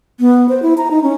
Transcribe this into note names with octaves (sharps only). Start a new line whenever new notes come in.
B3
C5
E4
A#5
D#4
C#4